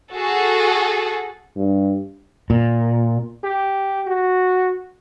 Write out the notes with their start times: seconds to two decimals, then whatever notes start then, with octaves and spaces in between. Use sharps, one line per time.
0.15 F#4 G#4 A4
1.56 G2
2.50 A#2
3.44 G4
4.07 F#4